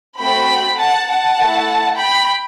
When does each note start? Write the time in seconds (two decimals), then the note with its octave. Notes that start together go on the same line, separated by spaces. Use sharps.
0.19 A3 C4 F#4 A4 G5 B5
0.78 F#5 A5
1.08 F#5 A5
1.37 A3 E4 A4
1.96 G5 B5